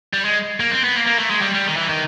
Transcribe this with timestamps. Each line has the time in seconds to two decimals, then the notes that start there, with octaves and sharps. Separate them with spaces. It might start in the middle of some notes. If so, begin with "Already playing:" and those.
0.14 G3
0.25 G#3
0.60 A#3
0.71 C4
0.84 B3
0.96 A#3
1.07 A#3
1.19 A3
1.31 G#3
1.42 G3
1.54 G3
1.66 D#3
1.77 E3
1.89 D#3